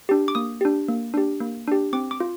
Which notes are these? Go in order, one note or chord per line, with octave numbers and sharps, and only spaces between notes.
D4 G4
D6
A#3 D#6
D4 G4
A#3
D4 G4
A#3
D4 G4
C4 D6
D6
F4